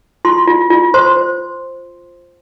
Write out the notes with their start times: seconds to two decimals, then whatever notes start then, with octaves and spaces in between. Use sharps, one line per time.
0.25 F4 C6
0.47 F4
0.70 F4
0.94 C5 C6
1.17 C5